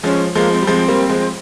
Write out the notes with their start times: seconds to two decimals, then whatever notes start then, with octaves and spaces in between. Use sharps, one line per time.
0.03 F3 G#3 C#4
0.35 F3 G#3 A#3
0.52 C4
0.62 G3
0.67 F3 G#3 C4
0.88 G3 A#3
1.10 F3 G#3